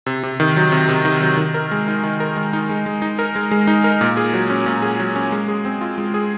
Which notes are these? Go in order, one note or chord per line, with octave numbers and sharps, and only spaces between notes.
C3
C3
D#3
F#3
C3
C3
D#3
F#3
D#3
A#4
G#3
D#4
D#3
A#4
G#3
D#4
G#3
G#3
D#4
A#4
G#3
G#3
D#4
A#4
A#2
G#4
F#3
C#4
A#2
G#4
F#3
C#4
G#3
G#4
C4
F4
G#3
G#4